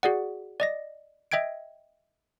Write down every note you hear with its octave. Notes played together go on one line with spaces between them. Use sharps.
F#4 G#4 D5 F#5
D5 D#5 A#6
D#5 E5 G5 G#6 D7